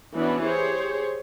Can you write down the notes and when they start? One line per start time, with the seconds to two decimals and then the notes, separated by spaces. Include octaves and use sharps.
0.15 E3 B3 C#4 D4 F#4
0.43 G4 G#4 C5 C#5